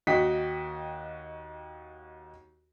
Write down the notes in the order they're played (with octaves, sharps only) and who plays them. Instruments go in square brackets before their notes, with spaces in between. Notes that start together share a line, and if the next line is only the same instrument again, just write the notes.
[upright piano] D#2 F#4 D#5 G5 B6